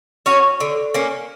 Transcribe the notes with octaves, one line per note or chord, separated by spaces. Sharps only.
C#4 F#4 C#5
D3
A#3 C#4